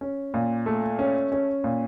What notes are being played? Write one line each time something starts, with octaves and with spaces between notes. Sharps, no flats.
C#4
A#2
A3
C#4
C#4
A#2